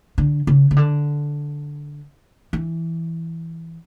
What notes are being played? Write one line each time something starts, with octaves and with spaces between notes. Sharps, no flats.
D3
C#3
C#3
D3
E3